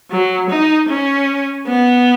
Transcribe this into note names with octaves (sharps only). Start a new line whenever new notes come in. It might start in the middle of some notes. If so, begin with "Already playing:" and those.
F#3
D#4
C#4
B3